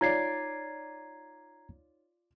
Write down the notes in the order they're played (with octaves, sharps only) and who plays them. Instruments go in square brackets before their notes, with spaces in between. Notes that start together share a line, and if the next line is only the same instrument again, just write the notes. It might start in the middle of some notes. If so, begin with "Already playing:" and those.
[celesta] D#4 C#5 [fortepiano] F4 D5 [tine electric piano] A#5 G#6 C7